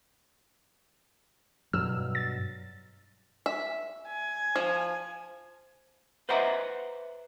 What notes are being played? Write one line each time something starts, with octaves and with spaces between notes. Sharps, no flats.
G2 B2 F#3 E6 F6
A6
E5
G#5
F3
B4 C5 D#5 E5 F#5 A#5